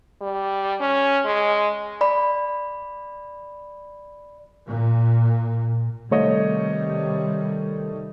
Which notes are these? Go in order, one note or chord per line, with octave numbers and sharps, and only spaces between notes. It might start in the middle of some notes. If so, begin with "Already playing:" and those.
G3
C#4
G#3
D5 B5
A#2
C3 D#3 G3 A3 C#5 D#5